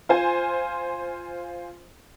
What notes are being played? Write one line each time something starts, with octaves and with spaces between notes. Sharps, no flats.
F4 C5 G#5